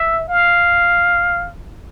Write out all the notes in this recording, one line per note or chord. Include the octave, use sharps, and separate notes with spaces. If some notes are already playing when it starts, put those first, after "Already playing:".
Already playing: E5
F5